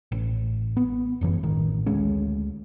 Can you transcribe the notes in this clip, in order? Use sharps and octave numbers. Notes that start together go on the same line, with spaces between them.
A1
B3
G1 F#2 E3
A1 D#3
D2 G#3 C#4